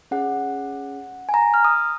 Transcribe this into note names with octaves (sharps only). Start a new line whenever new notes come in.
C#4 G#4 F#5
G#5
A#5
F6
D#6